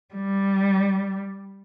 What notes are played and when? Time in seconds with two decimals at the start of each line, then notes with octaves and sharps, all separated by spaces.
0.14 G3